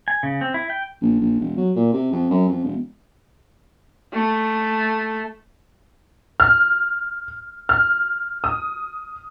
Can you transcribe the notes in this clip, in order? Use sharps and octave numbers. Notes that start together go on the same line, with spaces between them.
G#5
C#3
C4
E4
G5
A#1
A#1
E1
F#3
A#2
C3
F2
F#2
F2
E1
A3
F6
F6
D#6